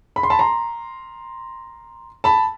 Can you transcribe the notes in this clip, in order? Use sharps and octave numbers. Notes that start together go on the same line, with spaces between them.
B5
C6
A5 B5
A#5 C6
A5 B5